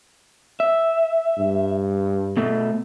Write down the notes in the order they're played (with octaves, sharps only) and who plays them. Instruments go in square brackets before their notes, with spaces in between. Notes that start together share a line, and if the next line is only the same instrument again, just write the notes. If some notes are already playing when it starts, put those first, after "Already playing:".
[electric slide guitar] E5
[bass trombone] G2
[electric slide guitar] B2 A3